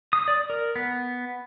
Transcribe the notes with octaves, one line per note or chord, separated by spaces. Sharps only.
D#6
D5
A#4
B3